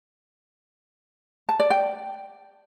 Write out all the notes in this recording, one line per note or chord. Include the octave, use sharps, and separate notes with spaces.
A5
D5
G5